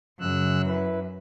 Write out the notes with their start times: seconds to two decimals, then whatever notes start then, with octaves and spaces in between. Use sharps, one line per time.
0.20 F#2 C#3 E6 F#6
0.65 E4 B4